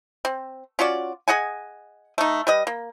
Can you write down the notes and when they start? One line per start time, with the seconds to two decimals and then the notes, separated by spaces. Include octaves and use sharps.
0.25 C4
0.79 C#4 F4 F#4 D5
1.28 G#4 D#5 F#5 G#5
2.18 A3 D#4
2.47 G3 B4 D#5
2.67 A#3